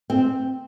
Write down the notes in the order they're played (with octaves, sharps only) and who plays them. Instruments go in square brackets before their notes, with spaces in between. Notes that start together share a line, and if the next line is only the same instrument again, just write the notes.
[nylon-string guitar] C4